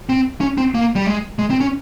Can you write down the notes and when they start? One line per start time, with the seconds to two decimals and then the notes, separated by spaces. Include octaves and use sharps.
0.09 C4
0.41 C#4
0.58 C4
0.74 A#3
0.96 G3
1.07 G#3
1.39 G#3
1.50 C4
1.60 C#4